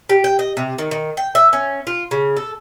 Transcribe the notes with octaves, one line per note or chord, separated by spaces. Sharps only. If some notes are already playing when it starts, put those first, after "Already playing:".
G4
G5
D#5
C3
D#3
D#3
G5
E5
C#4
F4
C#3
A4